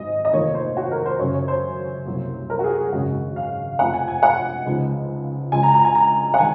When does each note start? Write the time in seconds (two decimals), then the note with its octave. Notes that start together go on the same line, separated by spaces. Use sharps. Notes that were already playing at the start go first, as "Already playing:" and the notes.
Already playing: G#1 G#2 F#3 C4 D#5
0.25 D#5
0.33 F1 F2 D#3 A#3 C#5
0.55 C5
0.77 F#4
0.91 A#4
1.06 C5
1.19 F#2 C#3 F#3 C#4 C#5
1.34 C#5
1.48 C5
2.06 C2 C3 F#3 A#3
2.50 A#4
2.59 F#4
2.64 G#4
2.78 G#4
2.93 G#1 F#2 C#3 G#3 C#4 F#4
3.36 F5
3.79 F1 F2 C3 F3 F#5
3.94 G#5
4.08 G#5
4.23 F#5
4.65 C#2 C#3 F3 G#3 D#4
5.52 C#2 C#3 F3 G#3 G#5
5.63 A#5
5.74 A#5
5.85 G#5
5.95 A#5
6.34 F#5
6.39 D#3 G#3 D#4 G#5